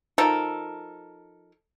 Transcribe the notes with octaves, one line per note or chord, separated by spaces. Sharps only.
F3 D#4 A4 A#4